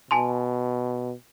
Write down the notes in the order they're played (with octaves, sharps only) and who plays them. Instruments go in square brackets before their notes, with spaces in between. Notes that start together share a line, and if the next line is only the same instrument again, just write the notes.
[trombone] B2 [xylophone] G#5 A5 C6